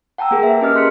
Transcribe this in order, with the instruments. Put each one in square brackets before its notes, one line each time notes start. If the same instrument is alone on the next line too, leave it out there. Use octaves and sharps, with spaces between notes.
[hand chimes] F#5 G5 A5 A#5 E6
A#3 G#4 A#4
A#4 B4 E5
C#4 G4 D#5 F6
C6 F#6 B6 C#7